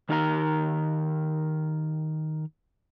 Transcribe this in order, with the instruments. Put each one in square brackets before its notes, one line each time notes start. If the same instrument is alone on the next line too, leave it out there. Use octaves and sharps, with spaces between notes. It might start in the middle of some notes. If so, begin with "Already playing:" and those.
[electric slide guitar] D#3 D#4 G4 A#4 E5 A#5